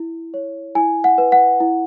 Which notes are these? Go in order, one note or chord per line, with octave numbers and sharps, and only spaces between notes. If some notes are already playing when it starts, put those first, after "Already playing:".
Already playing: E4
C#5
E4 G#5
F#5
B4
F#5
E4